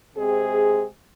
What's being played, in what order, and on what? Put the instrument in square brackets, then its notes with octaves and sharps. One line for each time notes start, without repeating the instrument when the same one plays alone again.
[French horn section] C3 G#3 C4 G#4